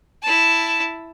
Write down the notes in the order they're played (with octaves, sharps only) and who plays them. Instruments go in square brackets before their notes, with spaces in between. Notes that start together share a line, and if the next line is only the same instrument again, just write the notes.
[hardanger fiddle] E4 A5